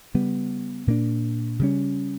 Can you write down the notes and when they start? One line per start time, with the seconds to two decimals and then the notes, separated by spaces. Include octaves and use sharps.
0.14 C#3 G3 B3
0.87 A#2 A#3 D4
1.59 C#3 G3 C#4